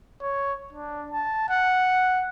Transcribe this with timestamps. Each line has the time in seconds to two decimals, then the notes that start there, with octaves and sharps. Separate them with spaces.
0.22 C#5
0.73 D4
1.12 A5
1.50 F#5